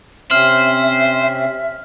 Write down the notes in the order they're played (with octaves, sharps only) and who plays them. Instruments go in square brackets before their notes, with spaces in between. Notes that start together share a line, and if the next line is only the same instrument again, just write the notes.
[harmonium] C3 C4 C#4 [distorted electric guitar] C5 [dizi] E5 [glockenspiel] F6 F#7